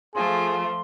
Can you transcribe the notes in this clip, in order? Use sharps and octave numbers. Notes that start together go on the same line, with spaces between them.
F3 A3 F4 G#4 C6